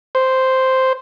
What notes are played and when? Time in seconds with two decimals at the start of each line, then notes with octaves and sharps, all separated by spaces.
0.15 C5